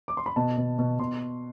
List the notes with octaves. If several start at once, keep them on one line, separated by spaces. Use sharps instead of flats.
D6
C6
B5
B2 A5
B2
B2
B2 C6